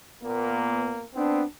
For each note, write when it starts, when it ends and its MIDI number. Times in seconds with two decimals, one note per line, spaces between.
0.23 1.02 46
0.23 1.02 58
0.23 1.02 59
1.15 1.42 59
1.15 1.42 60
1.15 1.42 62